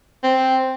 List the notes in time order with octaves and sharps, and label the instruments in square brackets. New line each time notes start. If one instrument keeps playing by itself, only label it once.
[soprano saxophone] C4